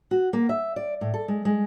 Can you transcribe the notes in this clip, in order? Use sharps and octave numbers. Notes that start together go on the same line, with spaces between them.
F#4
A#3
E5
D5
A2
A4
G#3
G#3